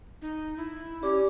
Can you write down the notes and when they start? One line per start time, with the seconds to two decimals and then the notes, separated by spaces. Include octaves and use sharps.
0.22 D#4
0.57 E4
1.03 C#4 G4 D5 D6